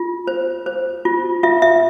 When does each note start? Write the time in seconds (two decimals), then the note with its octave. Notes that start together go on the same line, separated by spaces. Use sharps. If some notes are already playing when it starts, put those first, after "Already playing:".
Already playing: F4
0.27 C5
0.66 C5
1.05 F4
1.43 F4 E5
1.62 E5